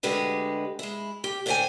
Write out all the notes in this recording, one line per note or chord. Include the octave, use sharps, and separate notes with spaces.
D2 D3 G#3 G4 B4 D#5
G#3 E4
G4
A2 D3 C5 E5 G5 G#5